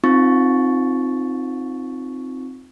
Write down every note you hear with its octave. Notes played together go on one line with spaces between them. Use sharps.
C4 D#4 F4 C#6 A6